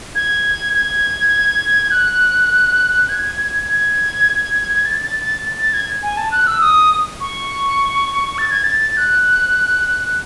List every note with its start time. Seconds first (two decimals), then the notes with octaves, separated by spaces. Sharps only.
0.15 G#6
0.73 G#6
1.91 F#6
3.09 G#6
3.68 G#6
4.85 A6
5.03 A6
5.21 A6
5.59 A6
5.73 G#6
6.03 G#5
6.17 A5
6.32 F#6
6.47 E6
6.61 D#6
7.20 C#6
8.38 A6
8.51 G#6
8.64 A6
8.97 F#6